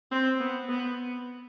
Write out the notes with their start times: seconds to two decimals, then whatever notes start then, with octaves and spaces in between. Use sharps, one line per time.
0.11 C4
0.40 B3
0.69 B3